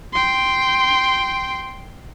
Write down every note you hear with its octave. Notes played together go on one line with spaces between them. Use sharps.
G5 C6